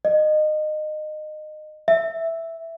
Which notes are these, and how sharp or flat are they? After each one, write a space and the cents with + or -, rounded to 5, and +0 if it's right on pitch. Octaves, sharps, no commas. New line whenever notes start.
D#5 -25
E5 +0